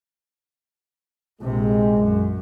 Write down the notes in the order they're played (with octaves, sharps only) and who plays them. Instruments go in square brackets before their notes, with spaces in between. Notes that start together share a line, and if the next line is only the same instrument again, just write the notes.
[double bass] A#1 C3 [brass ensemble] G#3
[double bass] F#2